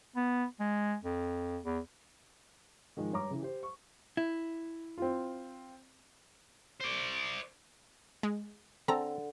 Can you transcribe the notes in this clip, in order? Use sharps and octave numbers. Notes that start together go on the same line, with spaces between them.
B3
G#3
F2
E2
G#2 D#3 F3 G#3
G2 C#5 A#5 D6
C#3 E3
G4 C5
C#6
E4
C4 F4
C5 D5
G#3
D3 C4 A4 A#5